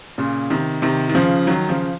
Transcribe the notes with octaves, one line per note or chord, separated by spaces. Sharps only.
A#2 C#3
C3 D#3
C3 D#3
D#3
C#3 F3
D#3 F#3
C#3 F3